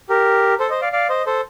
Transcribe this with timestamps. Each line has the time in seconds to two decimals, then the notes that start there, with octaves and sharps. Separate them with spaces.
0.09 G4 A#4
0.60 A4 C5
0.70 C5 D#5
0.81 D5 F5
0.92 D5 F5
1.09 C5 D#5
1.26 A4 C5